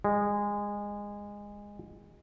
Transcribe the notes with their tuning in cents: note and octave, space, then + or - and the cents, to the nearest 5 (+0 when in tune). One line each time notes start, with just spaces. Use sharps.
G#3 -20